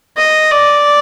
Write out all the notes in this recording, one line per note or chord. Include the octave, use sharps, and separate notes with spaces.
D#5
D5